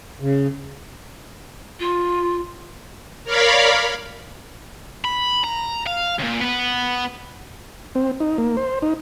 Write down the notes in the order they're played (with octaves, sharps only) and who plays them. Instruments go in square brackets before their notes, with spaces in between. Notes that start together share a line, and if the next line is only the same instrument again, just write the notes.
[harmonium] C#3
[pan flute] F4
[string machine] A#4 C#5 D5 F5 B5
[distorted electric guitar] B5
A#5
F5
C#2 A#2
B3 B4
[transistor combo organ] C4
D#4
A#3
C5
D#4